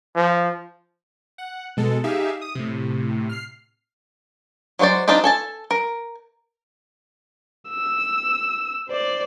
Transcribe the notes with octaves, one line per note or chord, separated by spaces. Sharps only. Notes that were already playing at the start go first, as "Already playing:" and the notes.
F3
F#5
B2 G#3 A4
D#4 G4 G#4 E5 F5
D#6
A2 C3
F6 C7
F#3 G#3 F#4 C5 D5
C4 D4 D#4 F4 G4
A4 G#5 A5
A#4
E6
C5 D5